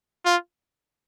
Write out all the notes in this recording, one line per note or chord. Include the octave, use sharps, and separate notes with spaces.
F4